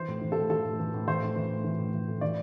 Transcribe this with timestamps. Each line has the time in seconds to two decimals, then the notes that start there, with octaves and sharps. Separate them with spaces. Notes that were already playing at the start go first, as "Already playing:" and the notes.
Already playing: E3 C5
0.08 A2
0.21 E3
0.32 A2 A4
0.50 E3 A4
0.65 A2
0.79 E3
0.94 A2
1.07 E3 C5
1.21 A2
1.36 E3
1.50 A2
1.64 E3
1.79 A2
1.94 E3
2.08 A2
2.21 E3 D5